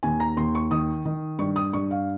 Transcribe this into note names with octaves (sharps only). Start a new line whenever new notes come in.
D#2 G#5
A#5
D#2 C6
C#6
D#3 D#6
D#3
G2 C#6
D#6
G2 C#6
F5